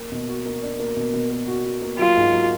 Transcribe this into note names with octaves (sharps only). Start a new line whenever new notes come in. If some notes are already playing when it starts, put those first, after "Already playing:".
Already playing: A#3
B2
F#4
A#3
D4
A#3
B2
B2
A#3
F#4
F#4
A#3
F#3 F4
G#2
F#3